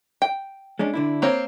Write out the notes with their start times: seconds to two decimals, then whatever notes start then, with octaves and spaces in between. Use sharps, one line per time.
0.22 G5
0.79 G#3 C#4 D4
0.94 D3 D4 E4
1.22 A#3 C4 C#5